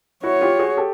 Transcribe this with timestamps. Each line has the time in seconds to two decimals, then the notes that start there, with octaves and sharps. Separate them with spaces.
0.23 E4 F#4 C#5
0.41 F4 G4
0.59 F#4 G#4
0.77 G4 A4